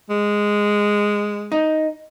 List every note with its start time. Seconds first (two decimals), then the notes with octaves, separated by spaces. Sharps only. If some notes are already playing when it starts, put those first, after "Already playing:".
0.10 G#3
1.52 D#4